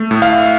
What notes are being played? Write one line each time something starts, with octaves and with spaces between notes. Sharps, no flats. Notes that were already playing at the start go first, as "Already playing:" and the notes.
Already playing: A3
A2
F5